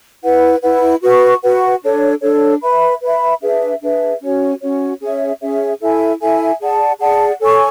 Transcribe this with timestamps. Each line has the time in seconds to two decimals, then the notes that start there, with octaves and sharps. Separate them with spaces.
0.23 E4 B4 F#5
0.62 E4 B4 F#5
1.02 F#4 B4 F#5 C#6
1.43 F#4 B4 F#5 C#6
1.83 D4 A4 C#5
2.22 D4 A4 C#5
2.62 B4 E5 B5
3.02 B4 E5 B5
3.42 D4 G#4 B4 E5
3.81 D4 G#4 B4 E5
4.21 C#4 F#4 C#5
4.61 C#4 F#4 C#5
5.01 C#4 G#4 C#5 E5
5.41 C#4 G#4 C#5 E5
5.81 E4 A4 E5 G#5
6.21 E4 A4 E5 G#5
6.60 G#4 D5 F#5 A5
6.99 G#4 D5 F#5 A5
7.40 A4 C#5 G#5 C#6